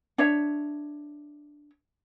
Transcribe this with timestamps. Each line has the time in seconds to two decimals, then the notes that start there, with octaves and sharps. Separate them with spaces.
0.18 D4 C#5 E5